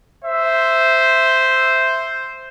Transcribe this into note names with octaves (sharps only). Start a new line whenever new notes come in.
C5 E5